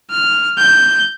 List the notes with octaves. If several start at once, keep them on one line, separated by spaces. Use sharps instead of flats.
F6
G6